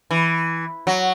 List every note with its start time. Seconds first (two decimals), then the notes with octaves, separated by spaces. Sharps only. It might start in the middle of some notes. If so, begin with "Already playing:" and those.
0.11 E3
0.87 F#3